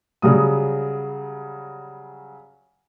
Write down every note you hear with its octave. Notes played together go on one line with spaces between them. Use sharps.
C#3 F#3 G3 D#6